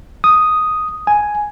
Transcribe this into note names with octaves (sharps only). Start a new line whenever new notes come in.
D#6
G#5